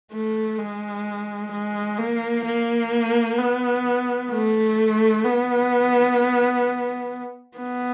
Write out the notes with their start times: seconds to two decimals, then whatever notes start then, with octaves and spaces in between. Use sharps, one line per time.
0.13 A3
0.59 G#3
1.52 G#3
1.98 A#3
2.45 A#3
3.38 B3
4.31 A3
5.24 B3
7.57 B3